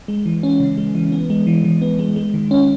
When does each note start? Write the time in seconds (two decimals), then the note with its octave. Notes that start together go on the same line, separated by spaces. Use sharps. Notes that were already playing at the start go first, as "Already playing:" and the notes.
0.08 G#3
0.26 E3
0.43 C#4
0.60 C#3
0.78 G#3
0.95 E3
1.12 B3
1.30 G#3
1.47 E3
1.64 E3
1.82 B3
1.99 G#3
2.16 G#3
2.34 D#3
2.51 C#4